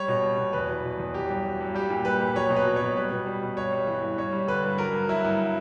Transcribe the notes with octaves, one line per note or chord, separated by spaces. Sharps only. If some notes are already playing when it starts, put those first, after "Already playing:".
Already playing: G3 C#5
B2
G3
B2
E2 B4
F#3
B2
E2
F#3 G4
G2
F#3
G2
G3 G4
A#2
G3 B4
A#2
F#3 C#5
B2
B4
F#3
C#5
B2
G3 B4
B2
G3
B2
G2 C#5
G3
E3
G2
G2 C#5
G3
D3 B4
G2
F#3 A#4
G2
F#3 E4
G2